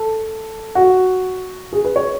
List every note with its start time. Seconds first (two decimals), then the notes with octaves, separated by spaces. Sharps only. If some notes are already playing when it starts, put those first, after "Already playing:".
Already playing: A4
0.75 F#4
1.73 G#4
1.85 B4
1.96 C#5